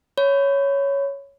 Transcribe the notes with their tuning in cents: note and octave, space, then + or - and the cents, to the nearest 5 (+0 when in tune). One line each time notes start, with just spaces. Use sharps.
C#5 +0 B5 +20